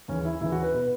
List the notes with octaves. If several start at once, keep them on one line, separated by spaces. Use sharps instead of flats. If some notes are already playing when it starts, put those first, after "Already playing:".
D#2 C#3 E3 C#4
E4
D#2 C#3 E3 E4
F#4
B4
B2 B4